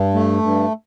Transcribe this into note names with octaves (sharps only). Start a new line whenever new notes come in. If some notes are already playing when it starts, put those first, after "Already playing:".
Already playing: G2
A3
G2